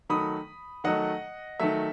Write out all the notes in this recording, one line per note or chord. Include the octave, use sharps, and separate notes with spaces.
D#3 F#3 A3 B5 D#6
D#3 F#3 A3 D#5 F#5
D#3 F#3 A3 E5